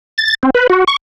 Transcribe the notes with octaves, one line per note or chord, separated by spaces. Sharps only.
A6
C4
B4
F#4
C#6